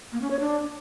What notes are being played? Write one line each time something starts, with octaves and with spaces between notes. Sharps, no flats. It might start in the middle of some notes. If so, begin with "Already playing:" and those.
A#3
C#4
C#5
D4